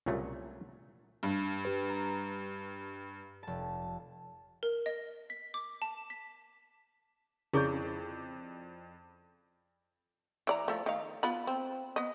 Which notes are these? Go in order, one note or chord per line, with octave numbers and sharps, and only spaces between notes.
C2 A#2 C#3 F#3 A3
G2
G4 B4
A#5
F1 A5
A#4
D#5
B6
D6
A5
B6
F2 C#3 E4 G#4 D5 C#6 G6
E3 D5 A#5
F3 A3
D#3 F5
B3 F4 B5
C4
B3 D#5